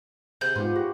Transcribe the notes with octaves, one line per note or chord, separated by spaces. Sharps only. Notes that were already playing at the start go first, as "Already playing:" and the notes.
C3 G#4 F#5 G6
G#2 B3 F4 G4
F#4 G4